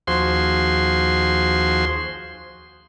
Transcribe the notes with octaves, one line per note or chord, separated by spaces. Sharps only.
D#2 F3 F#4 G#4 C5 C6